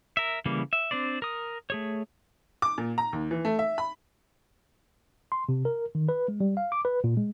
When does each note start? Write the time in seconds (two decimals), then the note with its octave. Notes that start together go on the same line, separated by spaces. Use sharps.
0.17 A#4 E5
0.46 C#3 E3 G3 A#3
0.73 E5
0.91 C4 D4 C5 D5
1.22 A#4 D#6
1.70 A3 G#4 C#5
2.62 D6
2.78 A#2
2.98 A#5
3.13 D#2
3.31 E3
3.45 A3
3.59 E5
3.78 B5
5.32 C6
5.49 C3
5.65 A#4
5.95 D#3
6.09 B4
6.28 G#3
6.41 G3
6.57 F5
6.72 D6
6.85 B4
7.04 A#2
7.17 G#3